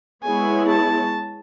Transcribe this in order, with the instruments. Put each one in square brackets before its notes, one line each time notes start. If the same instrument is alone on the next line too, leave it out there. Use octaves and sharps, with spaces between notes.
[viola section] G#3 B3 E4 G#4 C#5 [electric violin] G#5
[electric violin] A5